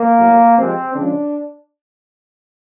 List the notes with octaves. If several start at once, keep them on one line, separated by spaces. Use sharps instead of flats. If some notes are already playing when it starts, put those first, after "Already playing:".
Already playing: A#3
A2 F#3 A3
C3 F3 G#3 C4
C#3 F3 G#3 D4